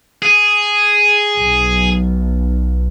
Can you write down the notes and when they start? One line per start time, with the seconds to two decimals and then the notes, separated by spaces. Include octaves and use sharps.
0.22 G#4
1.38 B1